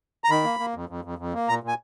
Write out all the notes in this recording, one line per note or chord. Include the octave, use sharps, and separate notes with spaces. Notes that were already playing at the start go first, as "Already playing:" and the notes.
A#5
D#3 B5
A#3
A#3
F2
F2
F2
F2
A#3
A#2 A#5
A#2 G#5